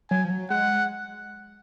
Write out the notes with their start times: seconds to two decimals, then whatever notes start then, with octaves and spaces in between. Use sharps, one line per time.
0.11 F#3 G#5
0.24 F3
0.30 F#3
0.50 G#3 F#5